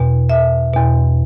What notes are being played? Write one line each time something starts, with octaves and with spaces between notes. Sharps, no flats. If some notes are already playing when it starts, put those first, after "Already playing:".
Already playing: E2 B2
E5
E2 B2